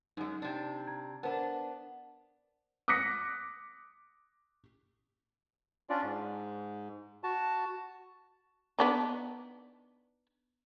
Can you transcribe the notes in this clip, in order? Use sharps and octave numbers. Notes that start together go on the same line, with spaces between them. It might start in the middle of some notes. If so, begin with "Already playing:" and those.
F#2 G#3 D#4
C3 D4
A#5 G#6
B3 D4 A#4 C5 A5
D6 D#6 F#6 A#6 B6 C#7
C#4 D4 F4 D5
G#2
F#4 A5
B3 D4 D#4